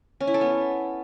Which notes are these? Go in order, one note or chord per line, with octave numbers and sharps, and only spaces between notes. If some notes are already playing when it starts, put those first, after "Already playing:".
C#4
E4
A4
B3